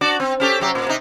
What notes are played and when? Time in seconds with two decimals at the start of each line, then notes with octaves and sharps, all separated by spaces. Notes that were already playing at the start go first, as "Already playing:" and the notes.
0.01 D4 F#4 D5
0.20 C4
0.40 C#4 G4 A4
0.60 C3 F#3 G4
0.75 A#2
0.87 C3 D#4